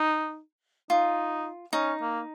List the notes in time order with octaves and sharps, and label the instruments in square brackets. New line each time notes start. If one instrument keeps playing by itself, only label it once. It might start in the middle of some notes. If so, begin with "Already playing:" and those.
Already playing: [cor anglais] D#4
[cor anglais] D#4 [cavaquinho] F4
[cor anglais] C#4 [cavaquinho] D#4
[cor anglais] A#3